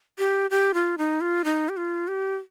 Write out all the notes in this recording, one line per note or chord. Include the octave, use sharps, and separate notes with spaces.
G4
G4
F4
D#4
F4
D#4
G4
F4
G4